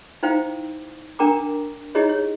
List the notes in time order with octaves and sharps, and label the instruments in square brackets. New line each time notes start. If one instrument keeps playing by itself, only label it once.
[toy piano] D#4 E4 C5 F5 G5
D4 A#4 G5 A#5 D6
D#4 E4 G4 G#4 C#5 D#5
C#5